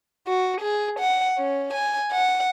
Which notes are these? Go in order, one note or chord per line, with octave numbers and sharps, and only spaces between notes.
F#4
G#4
F#5
C#4
G#5
F#5